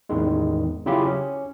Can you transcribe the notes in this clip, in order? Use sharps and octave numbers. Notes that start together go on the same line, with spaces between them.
A1 E2 D#3 G#3
C#3 F#3 E4 F4 G4 G#4
C#4